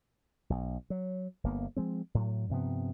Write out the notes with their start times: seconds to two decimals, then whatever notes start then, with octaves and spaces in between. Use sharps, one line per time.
0.50 B1
0.90 F#3
1.44 G1 A#3 B3
1.77 F3 G#3 C4
2.15 A2 F#3
2.49 G2 C3 F3 B3